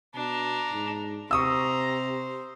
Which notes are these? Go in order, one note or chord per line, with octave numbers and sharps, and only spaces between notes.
B2 D4 A#5
G#2
C3 C5 A#5 C#6 D#6 E6